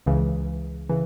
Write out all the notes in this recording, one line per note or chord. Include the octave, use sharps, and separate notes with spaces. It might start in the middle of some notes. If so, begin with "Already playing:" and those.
C#2 C#3 E3
C#3 E3